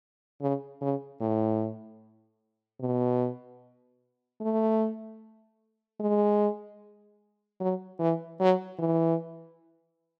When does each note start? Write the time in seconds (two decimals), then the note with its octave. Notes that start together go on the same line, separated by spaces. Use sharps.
0.41 C#3
0.81 C#3
1.21 A2
2.80 B2
4.41 A3
6.00 G#3
7.60 F#3
8.00 E3
8.40 F#3
8.79 E3